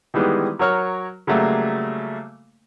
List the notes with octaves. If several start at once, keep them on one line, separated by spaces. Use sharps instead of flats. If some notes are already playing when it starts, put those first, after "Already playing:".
D#3 E3 G3 G#3 B3
F#3 A#4 C#5 F6
C#3 F#3 G3 A3 A#3